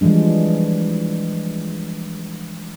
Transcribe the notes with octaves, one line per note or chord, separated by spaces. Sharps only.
E3 F3 G3 G#3 D4